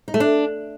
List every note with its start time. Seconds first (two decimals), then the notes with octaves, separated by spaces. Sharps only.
0.08 D#4
0.14 A3
0.20 D4